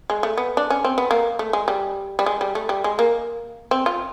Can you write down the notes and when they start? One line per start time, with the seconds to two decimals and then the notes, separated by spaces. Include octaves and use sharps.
0.10 G#3
0.23 A3
0.37 B3
0.57 D4
0.70 C#4
0.84 C4
0.98 B3
1.11 A#3
1.39 A3
1.53 G#3
1.68 G3
2.19 G3
2.26 G#3
2.41 G3
2.55 A3
2.69 G3
2.84 G#3
2.99 A#3
3.71 C4
3.86 F4